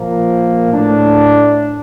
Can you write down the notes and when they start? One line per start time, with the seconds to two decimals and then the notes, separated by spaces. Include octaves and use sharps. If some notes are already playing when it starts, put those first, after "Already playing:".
Already playing: A#2 F3 A#3
0.71 A2 A3 D4